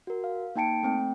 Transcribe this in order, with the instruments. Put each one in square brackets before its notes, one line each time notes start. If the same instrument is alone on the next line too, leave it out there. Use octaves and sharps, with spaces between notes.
[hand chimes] F#4 A#4
F5
A#3 D#4 G5 A5 C#7 D7
A3 C4 G5